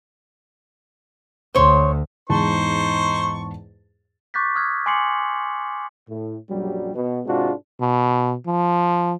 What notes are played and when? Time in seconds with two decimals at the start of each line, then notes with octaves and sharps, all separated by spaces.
1.55 D2 C5 C#5 C6
2.29 E2 G#2 D#4 C5 A5 C#6
4.34 C#6 D6 F#6 G6 A6 B6
4.55 D#6 F6 F#6 G#6
4.86 G#5 C6 D6 C7 C#7 F#7
6.08 A2
6.49 A#1 F#2 F#3 G3
6.94 B2
7.26 G#2 C3 G#3 D4 F4 F#4
7.81 B2
8.47 F3